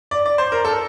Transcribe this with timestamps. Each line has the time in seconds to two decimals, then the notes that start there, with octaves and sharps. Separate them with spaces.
0.11 D5
0.26 D5
0.38 C5
0.52 A#4
0.65 A4